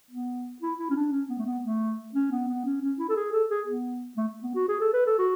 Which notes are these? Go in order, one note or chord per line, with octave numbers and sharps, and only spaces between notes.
B3
E4
E4
C#4
D4
C#4
B3
A3
B3
A3
C#4
B3
B3
C#4
C#4
E4
A4
G#4
A4
G#4
B3
A3
B3
F#4
G#4
A4
B4
A4
F#4